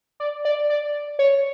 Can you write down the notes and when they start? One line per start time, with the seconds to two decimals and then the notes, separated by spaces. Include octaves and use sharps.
0.20 D5
0.45 D5
0.70 D5
1.19 C#5